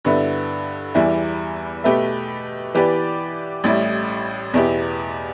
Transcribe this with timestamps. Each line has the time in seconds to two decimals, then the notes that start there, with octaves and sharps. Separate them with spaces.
0.05 G2 D3 B3 E4
0.95 E2 E3 G3 E4
1.84 B2 A3 G4 B4 E5
2.74 E3 B3 G4 B4 D5
3.64 A1 A2 G3 E4
4.54 E2 B2 B3 E4 G4